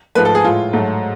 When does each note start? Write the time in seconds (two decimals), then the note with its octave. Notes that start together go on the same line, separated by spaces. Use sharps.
0.15 G#2 F3 A3 B4
0.25 A4
0.35 G#4
0.44 A2 G#3 F4
0.73 G#2 F#3 A3